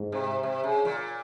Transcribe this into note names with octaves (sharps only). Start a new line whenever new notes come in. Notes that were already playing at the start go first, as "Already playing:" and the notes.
Already playing: G#2
C3
C3
C#3
A#2